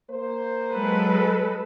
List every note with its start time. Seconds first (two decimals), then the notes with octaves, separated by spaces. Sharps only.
0.10 A#3 C5
0.71 F#3 G#3 A4 B4